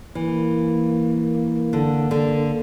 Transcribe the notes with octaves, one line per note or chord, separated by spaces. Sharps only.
E3 A#3
D3
D3